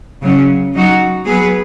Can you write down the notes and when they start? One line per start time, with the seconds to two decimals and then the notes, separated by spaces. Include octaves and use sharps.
0.22 C#3 F#3 C#4
0.74 F#3 D#4 F#4
1.25 F#3 B3 G#4 B4